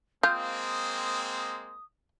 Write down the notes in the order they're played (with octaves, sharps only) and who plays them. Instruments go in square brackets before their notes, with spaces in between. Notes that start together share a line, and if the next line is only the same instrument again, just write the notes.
[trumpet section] G#3 A#3 C4 [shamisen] F4 [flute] D#6 [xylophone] G6